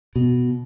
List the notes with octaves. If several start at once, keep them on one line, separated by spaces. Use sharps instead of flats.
B2